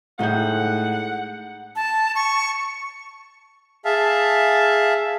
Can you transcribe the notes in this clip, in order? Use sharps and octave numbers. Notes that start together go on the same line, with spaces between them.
A2 G#3 D#4 F#5 G6
A5
C#6
G#4 E5 F5 A5